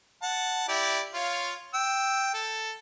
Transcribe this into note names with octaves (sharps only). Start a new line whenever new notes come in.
F#5 A5
E4 G4 D5
F4 C#5 F5
G5 E6
A4